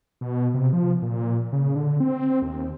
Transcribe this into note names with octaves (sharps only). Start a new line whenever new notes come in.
B2
C3
F3
A#2
C#3
D3
C4
D#2